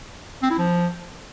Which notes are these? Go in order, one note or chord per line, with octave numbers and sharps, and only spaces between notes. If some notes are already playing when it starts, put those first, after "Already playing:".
C4
E4
F3